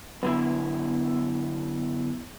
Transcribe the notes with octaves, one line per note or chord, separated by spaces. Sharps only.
F#2 D3 B3 E4